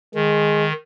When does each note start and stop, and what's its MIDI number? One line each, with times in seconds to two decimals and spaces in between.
0.15 0.73 51
0.15 0.65 56